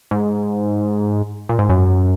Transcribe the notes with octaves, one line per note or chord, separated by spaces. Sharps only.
G#2
A#2
G#2
F#2